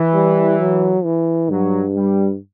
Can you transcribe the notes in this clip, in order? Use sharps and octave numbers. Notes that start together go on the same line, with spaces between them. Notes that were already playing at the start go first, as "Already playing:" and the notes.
Already playing: E3
G3
F#3
E3
G2 F#3
G3